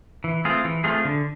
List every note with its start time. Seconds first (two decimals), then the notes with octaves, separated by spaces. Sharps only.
0.24 E3
0.45 A3 C4 F4 G#4
0.65 E3
0.84 A3 C4 F4 G#4
1.05 D3